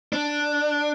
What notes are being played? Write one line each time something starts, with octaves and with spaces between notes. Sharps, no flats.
D4